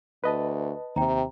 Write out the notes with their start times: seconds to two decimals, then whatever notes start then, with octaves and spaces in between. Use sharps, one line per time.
0.24 D2 B4 D#5 A5
0.96 D#2 C3 G5 A#5